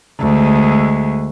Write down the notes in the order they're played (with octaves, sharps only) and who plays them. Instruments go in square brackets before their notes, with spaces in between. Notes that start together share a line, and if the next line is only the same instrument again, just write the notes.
[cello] D2 G#3